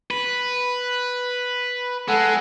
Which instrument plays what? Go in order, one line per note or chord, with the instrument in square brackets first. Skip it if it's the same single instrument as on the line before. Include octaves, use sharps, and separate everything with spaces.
[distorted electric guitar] B4
[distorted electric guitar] G#3 [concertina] A4 F#5